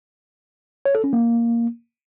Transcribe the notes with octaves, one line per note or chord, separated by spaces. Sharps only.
C#5
A4
C#4
A#3